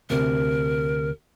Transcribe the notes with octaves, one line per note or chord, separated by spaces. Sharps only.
D2 C3 A#4